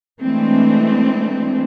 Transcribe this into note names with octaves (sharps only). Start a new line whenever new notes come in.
E3 G#3 A3 C4 D4